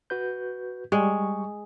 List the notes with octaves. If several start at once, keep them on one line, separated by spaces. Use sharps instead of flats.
F#4 B4 G6
G3 G#3 C#6